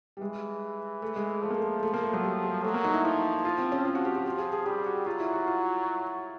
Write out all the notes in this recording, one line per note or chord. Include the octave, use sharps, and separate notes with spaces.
G3
E3 G#3
A3
G#3
F3 A3
A#3
A3
A3
A#3
A3
F#3
G3
G3
F#3 A3
A#3
D#4
E4
F3 E4
F4
C4
C#4
F3 F4
F#4
G4
G4
F3 G4
G#4
G#4
G3 G4
F#4
F#3 F4
E4
F#4
F4